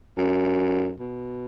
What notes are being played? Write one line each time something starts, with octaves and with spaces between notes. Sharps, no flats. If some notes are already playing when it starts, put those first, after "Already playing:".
F#2
B2